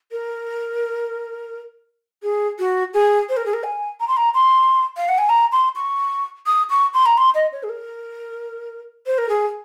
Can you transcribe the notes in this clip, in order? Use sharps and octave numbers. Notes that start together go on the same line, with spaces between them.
A#4
G#4
F#4
G#4
C5
A#4
G#4
A#4
G#5
A#5
C6
A#5
C6
F5
F#5
G#5
A#5
C6
C#6
D#6
C#6
C6
A#5
C6
D#5
C#5
G#4
A#4
C5
A#4
G#4